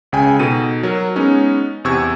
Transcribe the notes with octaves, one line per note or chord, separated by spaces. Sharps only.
C#2 C#3 G5 G#5
B2 D#4 A4 D#7
F#3 A#4
G#3 B3 C#4 D#4
E2 C3 C#6 E6 G#6